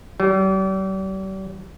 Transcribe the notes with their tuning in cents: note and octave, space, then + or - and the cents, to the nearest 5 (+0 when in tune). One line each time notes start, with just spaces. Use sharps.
G3 -40